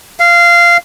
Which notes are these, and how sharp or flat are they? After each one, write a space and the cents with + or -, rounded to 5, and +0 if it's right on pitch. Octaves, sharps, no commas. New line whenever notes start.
F5 -15